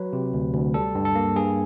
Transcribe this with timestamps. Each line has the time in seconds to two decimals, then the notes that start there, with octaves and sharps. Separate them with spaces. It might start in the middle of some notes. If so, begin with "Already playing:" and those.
Already playing: F#3 B4
0.13 C3
0.34 D2
0.54 D2
0.74 G3 A4
0.95 G2
1.05 A4
1.15 A#3
1.36 G2 G#4